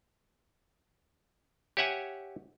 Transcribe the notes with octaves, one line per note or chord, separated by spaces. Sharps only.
G4 C#5 E5 F#5 G#5